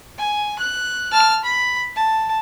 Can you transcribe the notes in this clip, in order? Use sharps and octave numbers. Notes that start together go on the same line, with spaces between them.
G#5
F#6
A5 F6
B5
A5